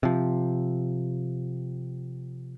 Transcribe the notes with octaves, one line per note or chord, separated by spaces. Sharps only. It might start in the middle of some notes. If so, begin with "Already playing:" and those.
C3 F3